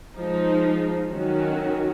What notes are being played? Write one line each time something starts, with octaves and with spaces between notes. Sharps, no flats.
F3 G#3 D#4
D#3 F#3 C#4 F#4